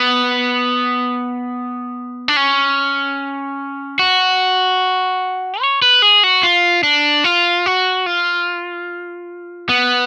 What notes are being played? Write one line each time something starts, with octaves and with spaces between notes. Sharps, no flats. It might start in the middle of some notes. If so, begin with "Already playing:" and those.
Already playing: B3
D4
C#4
F#4
C#5
B4
G#4
F#4
F4
D4
F4
F#4
F4
B3